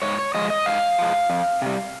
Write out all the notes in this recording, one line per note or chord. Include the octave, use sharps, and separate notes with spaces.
G#2 C#5
C#5
F3 G#3 D#5
D#5
G#2 F5
F3 G#3
F2
C3 G3